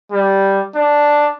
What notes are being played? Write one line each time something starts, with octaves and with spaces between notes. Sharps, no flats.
G3
D4